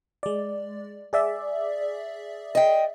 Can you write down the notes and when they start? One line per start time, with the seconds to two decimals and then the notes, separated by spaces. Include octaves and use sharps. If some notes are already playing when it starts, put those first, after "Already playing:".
0.23 G#3 D5
1.13 G#4 D5 E5
2.55 D#5 G5